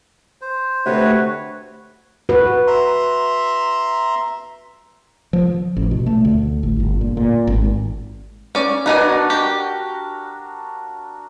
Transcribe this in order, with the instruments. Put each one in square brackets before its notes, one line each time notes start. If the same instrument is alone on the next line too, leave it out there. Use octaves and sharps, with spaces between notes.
[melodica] C5
[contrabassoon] D2 [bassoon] C3 [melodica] F#4 B4 C#5
[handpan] F#4 B4
[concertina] E5 A#5 C6
[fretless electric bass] F3
A1
B2
A3
D2
A1
G1
A#2
A#2
G#1
[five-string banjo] C#4 D5
[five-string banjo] B3 D#4 G#5 [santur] D4 F#4 A#4
[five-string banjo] G4